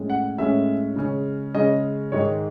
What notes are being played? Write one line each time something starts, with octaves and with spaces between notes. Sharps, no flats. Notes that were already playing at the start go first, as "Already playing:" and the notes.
Already playing: A2 G#3 C#4
F#5
A2 G#3 C#4 E5
C#3 G#3 C#4
C#3 G#3 C#4 D#5
G#2 D#3 G#3 D#4 C#5